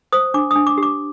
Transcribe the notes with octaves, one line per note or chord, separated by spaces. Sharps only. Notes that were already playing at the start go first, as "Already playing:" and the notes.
C5 D#6
D4 D6
D4 D#6
D6
G4
D6